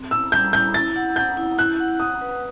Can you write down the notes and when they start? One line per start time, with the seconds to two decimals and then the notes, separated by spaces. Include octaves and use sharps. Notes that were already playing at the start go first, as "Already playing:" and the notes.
Already playing: C4
0.11 E4 E6
0.32 G3 G6
0.53 E4 G6
0.74 E4 A6
0.96 F#5
1.16 F#5 G6
1.37 E4
1.58 E4 F#6
1.80 F#5
2.00 F#5 D#6
2.21 B4